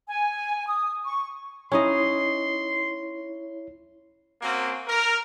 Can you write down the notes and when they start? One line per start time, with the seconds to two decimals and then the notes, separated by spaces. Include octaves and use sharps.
0.08 G#5
0.67 D#6
1.05 C#6
1.72 C#4 D#4 E4 C#5 D#5 C6
4.42 A#3 C4 C#4 F#4
4.88 A#4